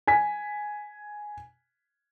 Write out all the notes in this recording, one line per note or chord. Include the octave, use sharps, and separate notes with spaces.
G#5 B6